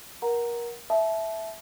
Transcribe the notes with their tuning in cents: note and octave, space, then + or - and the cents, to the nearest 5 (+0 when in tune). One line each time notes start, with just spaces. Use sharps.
A#4 +25 F#5 +5 A#5 +0
E5 +0 A5 -30